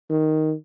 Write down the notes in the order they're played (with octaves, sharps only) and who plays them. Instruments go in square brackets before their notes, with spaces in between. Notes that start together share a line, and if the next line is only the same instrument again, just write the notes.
[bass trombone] D#3